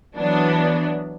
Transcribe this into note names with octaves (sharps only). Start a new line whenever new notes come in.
E3 F#3 B3 D4